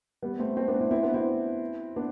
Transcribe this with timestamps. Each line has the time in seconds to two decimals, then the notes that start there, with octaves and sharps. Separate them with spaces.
0.22 G3 B3
0.39 A3 C4
0.57 A3 C4
0.68 B3 D4
0.80 C4 E4
0.91 C4 E4
1.03 B3 D4
1.14 C4 E4
1.96 B3 D4